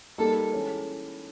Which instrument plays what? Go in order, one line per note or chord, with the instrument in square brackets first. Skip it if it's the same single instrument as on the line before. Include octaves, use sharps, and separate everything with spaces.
[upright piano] G3 A#3 D#4 G#4 [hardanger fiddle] A4
[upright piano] E3 G#3 C#4